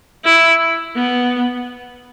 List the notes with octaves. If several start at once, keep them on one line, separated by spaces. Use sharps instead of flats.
E4
B3